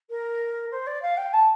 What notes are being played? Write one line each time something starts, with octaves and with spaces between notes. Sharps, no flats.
A#4
C5
D5
F5
G5
A5